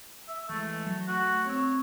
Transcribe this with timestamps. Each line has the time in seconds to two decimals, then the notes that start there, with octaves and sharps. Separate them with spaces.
0.28 E5
0.49 E3 G#3 A3
0.87 F#3
1.08 A3 F#4
1.46 C4 C#5 E6